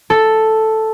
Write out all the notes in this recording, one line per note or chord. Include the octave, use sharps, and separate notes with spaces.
A4